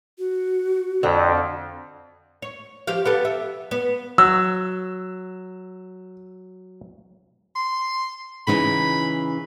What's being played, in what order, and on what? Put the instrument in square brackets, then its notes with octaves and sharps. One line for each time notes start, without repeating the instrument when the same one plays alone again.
[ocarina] F#4
[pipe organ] F2 [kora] D3 C4
[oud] C#5
F3 G4 F5
B3 G4 A4
E5
B3
[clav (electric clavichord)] F#3 [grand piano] E6
[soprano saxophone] C6
[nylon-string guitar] C#3 E3 D#4 [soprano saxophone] B5